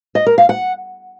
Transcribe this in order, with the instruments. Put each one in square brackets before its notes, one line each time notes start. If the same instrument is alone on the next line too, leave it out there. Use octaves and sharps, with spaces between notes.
[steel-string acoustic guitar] D#5
A#4
F5
F#5